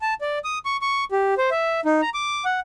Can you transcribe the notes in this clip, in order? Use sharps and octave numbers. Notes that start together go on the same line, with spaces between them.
A5
D5
D#6
C#6
C#6
G4
C5
E5
D#4
A#5
D6
F#5